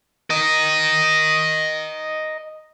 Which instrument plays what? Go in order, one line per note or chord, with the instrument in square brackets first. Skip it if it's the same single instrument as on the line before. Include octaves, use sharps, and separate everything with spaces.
[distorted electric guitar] A#4 D#5